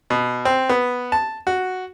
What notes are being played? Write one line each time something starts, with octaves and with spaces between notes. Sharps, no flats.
B2
C4
B3
A5
F#4